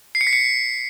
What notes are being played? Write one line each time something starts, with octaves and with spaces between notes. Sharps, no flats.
C7
C#7
B6
C#7